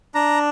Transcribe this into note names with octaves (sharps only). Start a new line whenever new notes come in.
D4 A#5